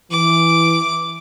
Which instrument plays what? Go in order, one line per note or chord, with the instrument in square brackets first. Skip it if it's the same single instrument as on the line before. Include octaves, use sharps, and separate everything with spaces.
[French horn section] E3 [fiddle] D6